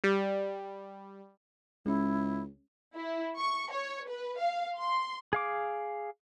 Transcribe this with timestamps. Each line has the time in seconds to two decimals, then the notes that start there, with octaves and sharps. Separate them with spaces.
0.04 G3
1.86 C#2 G#3 C#4 E4
2.95 E4
3.37 C#6
3.72 C#5
4.08 B4
4.40 F5
4.79 C6
5.33 G#4 F5 D6